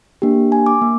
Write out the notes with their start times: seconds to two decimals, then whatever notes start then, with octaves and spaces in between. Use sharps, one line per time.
0.22 A#3 D4 G4
0.52 G#5
0.66 D6
0.82 A#3